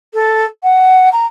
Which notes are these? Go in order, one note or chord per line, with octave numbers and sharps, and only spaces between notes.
A4
F#5
A#5